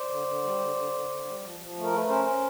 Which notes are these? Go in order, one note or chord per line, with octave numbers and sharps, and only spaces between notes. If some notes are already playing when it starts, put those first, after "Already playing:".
Already playing: C5 D5
D3
D3
G3
D3
D3
D3
D3
G3
F3
F3
A3
A#4
A3 B4
C#4 A#4 C5
C#4